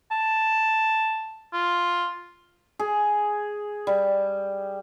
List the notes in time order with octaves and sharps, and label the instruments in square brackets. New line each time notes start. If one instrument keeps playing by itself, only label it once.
[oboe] A5
F4
[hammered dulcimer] G#4
G3